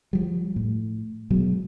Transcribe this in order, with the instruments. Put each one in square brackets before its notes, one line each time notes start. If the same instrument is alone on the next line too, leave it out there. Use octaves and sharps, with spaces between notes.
[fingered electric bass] F3 G3
A2
B2 F#3 G#3